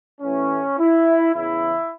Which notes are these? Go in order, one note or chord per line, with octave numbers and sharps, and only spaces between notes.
A1 A2 E3 C#4
E4
E2 C#3 E3 E4